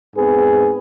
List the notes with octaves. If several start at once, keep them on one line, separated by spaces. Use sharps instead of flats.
G#2 B3 C4 G#4 B4